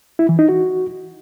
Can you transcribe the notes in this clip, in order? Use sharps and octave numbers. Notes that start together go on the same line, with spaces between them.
E4
E3
D#4
F#4